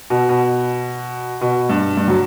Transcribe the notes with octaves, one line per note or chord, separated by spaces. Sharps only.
B2
B2
B2
G2
G2
F#3